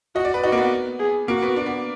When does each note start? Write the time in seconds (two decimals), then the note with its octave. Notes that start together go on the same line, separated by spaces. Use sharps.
0.15 F#4 D#5
0.25 D5
0.34 B4
0.44 D#4 F#4
0.52 A#3
0.57 B3
0.99 G#4
1.28 A#3 F#4
1.43 B3
1.56 D4
1.66 B3